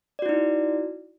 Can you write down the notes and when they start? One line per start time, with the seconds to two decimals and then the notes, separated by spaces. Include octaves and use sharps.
0.19 D5
0.22 F#4
0.26 E4
0.29 D#4